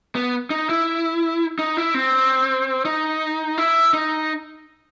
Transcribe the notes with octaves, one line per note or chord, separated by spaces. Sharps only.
B3
D#4
E4
D#4
E4
C4
D#4
E4
D#4